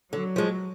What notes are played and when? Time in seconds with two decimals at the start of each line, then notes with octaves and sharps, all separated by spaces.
0.13 D3 F#3
0.36 F3 G#3